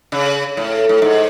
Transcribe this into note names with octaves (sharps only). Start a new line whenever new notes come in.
C#3
A2
A2
G#2